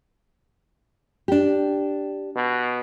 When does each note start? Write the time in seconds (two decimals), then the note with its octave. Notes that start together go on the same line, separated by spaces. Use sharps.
1.28 D4 G4
2.36 B2